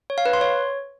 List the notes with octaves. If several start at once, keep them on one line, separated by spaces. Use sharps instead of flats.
C#5
F5
B4
C6
C#5